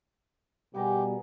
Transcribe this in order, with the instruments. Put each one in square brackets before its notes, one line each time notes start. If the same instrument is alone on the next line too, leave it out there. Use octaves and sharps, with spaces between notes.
[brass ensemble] B2 G3 [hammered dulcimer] B3 G#4 A#4 [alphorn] G4